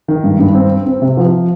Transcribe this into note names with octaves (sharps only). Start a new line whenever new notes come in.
D#3
G2
G2
C4
C4
C4
C3
F3